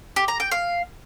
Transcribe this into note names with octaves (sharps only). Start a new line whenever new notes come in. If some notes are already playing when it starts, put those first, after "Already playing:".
G4
A#5
G5
F5